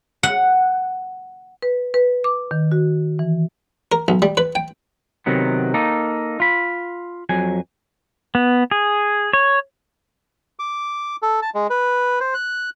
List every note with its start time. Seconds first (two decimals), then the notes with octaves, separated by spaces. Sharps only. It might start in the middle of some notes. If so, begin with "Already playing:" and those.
0.23 F#5
1.63 B4
1.94 B4
2.24 D6
2.51 D#3
2.72 F#4
3.19 E3
3.92 A#4
4.08 B1
4.22 G3
4.37 B4
4.55 G5
5.26 C3 D#3 F#3 B3
5.74 A#3 D#4 A4
6.40 F4 B5
7.29 F2 F#3 G#5
8.35 B3
8.71 G#4
9.33 C#5
10.59 D6
11.22 A4
11.42 A5
11.55 G#3
11.70 B4
12.20 C5
12.34 F#6